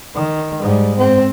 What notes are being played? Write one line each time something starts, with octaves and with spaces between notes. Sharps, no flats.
D#3
G#2 G3
C4